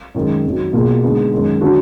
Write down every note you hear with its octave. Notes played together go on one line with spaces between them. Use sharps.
F#2 D#3 G#3
F2 D#3 F#3
B2 A#3 F4 G#4
D3 G#3 B3 D#4 G#4
F#2 D#3 G#3
D3 F#3 D4 F#4